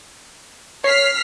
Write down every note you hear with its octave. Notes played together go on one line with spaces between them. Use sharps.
C#5 F6 B6 C7